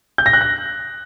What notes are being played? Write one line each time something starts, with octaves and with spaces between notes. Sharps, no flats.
G6
A#6
F#6
A#6